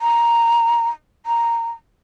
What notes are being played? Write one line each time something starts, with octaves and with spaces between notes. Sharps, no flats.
A#5
A#5